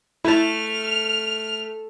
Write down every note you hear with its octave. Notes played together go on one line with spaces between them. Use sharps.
A3 E4 A5 F6